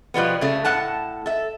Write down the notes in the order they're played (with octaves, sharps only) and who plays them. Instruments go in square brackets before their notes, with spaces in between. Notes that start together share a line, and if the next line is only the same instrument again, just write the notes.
[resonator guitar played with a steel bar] B2 F3 G3 B3
C#3 A3
A2 F#5 A5
A4 E5